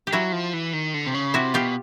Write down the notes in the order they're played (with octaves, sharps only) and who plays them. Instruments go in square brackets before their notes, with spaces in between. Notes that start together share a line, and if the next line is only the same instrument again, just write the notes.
[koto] G4
[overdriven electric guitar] F#3 [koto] E4 F#4
[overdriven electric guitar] F3
E3
D#3
D3
C3
C#3
[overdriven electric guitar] C3 [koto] E4 F#4
[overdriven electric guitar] B2 [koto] F4 G4